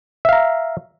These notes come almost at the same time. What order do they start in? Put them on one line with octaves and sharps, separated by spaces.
E5 F5 A#5